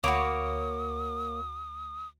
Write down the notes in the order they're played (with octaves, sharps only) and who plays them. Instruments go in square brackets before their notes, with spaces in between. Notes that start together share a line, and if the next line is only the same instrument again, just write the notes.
[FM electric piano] D2 [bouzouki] A#3 C#5 [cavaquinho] F#4 B5 D6 [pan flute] D#6